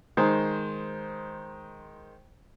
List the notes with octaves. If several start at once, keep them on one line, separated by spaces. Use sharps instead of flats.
D#3 G#3 C5